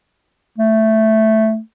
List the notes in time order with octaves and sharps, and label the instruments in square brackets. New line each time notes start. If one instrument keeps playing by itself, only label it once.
[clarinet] A3